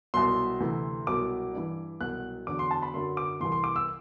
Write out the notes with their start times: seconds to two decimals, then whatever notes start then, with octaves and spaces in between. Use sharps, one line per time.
0.14 C2 B2 F#3 C6
0.60 D2 C3 E3
1.07 C2 B2 F#3 D6
1.54 G2 E3
2.01 C2 B2 F#3 F#6
2.47 E2 D3 F#3 D6
2.59 C6
2.71 A5
2.82 B5
2.94 F#2 D3 F#3 C6
3.17 D6
3.40 C2 C3 E3 C6
3.52 C6
3.64 D6
3.76 E6